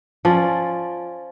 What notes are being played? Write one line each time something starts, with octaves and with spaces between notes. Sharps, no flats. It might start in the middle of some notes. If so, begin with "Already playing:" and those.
F3 C#4 D5